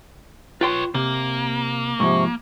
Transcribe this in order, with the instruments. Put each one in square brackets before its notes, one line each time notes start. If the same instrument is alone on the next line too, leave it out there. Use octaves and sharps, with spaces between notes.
[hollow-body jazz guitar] F4 G5 C6 [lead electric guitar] B4 C#5
[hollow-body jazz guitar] C3 [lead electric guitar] A#3
[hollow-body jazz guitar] G#2 F3 [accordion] C3 C#6